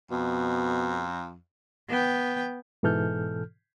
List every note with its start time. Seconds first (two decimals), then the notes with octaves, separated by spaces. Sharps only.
0.11 F2 B2
1.89 B3 G5
2.83 G#2 B2 E3 A4 F6 G6